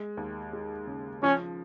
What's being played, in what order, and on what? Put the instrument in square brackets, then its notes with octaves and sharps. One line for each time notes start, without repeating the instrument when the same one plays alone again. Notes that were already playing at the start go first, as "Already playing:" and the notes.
Already playing: [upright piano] G#3
D#2
G#3
C#3
[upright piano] F3 [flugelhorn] C#4